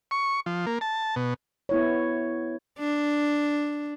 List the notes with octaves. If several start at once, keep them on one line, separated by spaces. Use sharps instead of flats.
C#6
F3
A#3
A5
B2
B3 E4 C#5
D4